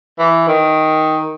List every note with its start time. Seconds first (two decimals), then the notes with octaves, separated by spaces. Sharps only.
0.19 E3
0.48 D#3